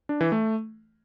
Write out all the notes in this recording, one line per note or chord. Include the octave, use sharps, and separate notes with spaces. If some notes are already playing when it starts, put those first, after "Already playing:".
D4
E3
A3